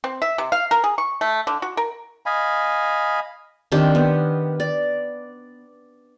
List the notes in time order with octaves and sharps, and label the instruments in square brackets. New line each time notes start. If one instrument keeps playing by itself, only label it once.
[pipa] C4
E5
C3
F5
A#4
G#4
C#6
A3
D3
F#4
A#4
[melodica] D#5 F5 G#5 B5
[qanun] D#3 C4 D4 G4
B3
D5